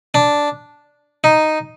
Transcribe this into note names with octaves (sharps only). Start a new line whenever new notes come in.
D4
D#4